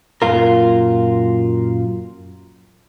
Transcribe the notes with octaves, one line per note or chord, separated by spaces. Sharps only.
F#2 A#2 F4 A#4